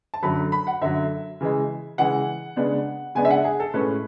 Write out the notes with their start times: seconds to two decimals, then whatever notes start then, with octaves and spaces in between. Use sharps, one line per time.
0.14 A5
0.23 F#2 D3 F#3 B5
0.52 B5
0.67 F#5
0.81 F#2 D3 F#3 E5
1.41 C#3 E3 G#3
1.98 C#3 E3 G#3 F#5
2.56 C#3 G#3 B3 D4
3.15 C#3 G#3 B3 D4 G#5
3.25 E5
3.30 F#5
3.44 G#4
3.60 A4
3.74 A2 G#3 C#4 B4